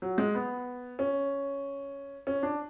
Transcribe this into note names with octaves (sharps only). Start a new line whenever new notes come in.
F#3
G#3
B3
C#4
C#4
D4